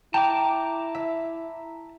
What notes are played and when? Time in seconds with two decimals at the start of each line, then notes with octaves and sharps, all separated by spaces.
0.14 E4 G5 A5 A#5 D6
0.95 E5